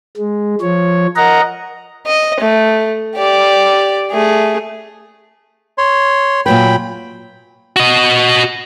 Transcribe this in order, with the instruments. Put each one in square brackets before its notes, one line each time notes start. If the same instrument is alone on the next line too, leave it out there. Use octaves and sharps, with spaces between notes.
[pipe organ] G#3
F3 C#5
A#4 D#5 F#5 A#5
[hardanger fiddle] D#5
A3
G4 D5
A3 G#4
[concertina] C#5 C6
[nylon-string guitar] A#2 F#3 B4 [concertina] G5 B5
[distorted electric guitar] F#4 D#5